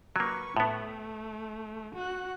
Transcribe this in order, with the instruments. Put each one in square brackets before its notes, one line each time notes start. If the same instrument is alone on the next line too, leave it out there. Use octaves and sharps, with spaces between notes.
[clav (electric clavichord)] F#3 A#3 [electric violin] B4 C#6
[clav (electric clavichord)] A2 B3 [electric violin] A3
[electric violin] F#4 F#6